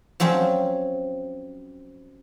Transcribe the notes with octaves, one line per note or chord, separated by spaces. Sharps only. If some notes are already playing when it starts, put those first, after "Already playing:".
F3 F#3 C4 C#4